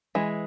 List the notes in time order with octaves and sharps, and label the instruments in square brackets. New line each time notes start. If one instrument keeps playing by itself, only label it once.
[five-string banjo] E3 G#3